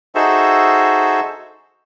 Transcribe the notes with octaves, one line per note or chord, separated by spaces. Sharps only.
D#4 F#4 G#4 A4 C5 E5